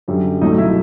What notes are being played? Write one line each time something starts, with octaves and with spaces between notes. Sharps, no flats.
F#2 D3 G3
C2 B2 F#3 A3 D#4 D#5
E4 E5